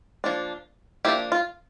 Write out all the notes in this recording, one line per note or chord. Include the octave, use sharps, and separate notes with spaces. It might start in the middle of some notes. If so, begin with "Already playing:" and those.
F3 A#3 D4
F3 A#3 D4 E4 G4
F4